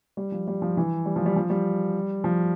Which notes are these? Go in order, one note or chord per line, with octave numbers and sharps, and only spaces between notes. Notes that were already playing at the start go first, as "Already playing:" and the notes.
G3
F3
G3
F3
E3
G3
F3
G3
F3
G3
F3